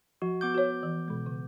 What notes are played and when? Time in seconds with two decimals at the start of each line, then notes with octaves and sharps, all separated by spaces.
0.22 F3 F#4
0.41 B3 D6 G6
0.55 F#4 C5 C#5
0.83 E3
1.08 B2 G#3
1.26 C#3